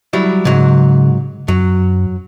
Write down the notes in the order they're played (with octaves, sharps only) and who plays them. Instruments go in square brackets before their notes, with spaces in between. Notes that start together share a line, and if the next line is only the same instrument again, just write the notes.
[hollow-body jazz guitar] F#3 G3 E4
[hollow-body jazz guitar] G#2 F#3 [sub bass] C#3
[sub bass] F#2 [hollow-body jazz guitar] F#3